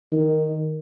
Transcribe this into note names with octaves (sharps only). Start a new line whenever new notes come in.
D#3